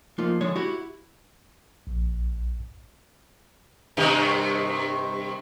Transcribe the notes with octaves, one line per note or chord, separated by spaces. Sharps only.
F3 A3 A#3 D#4 F4
D3 F3 G#3 C#5
E4 F#4 G4 E5
A#1
G2 C3 D#3